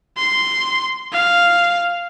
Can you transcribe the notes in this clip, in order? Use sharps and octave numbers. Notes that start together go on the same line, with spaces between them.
C6
F5